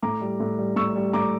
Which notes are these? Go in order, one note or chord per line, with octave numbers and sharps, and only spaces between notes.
A2 A#5 D6
G3
A2
G3
A2 C#6 E6
G3
A2 A#5 D6